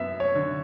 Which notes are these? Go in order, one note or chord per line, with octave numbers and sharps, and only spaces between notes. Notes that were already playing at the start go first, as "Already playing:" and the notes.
Already playing: F#2 B3 E5
C#5
D3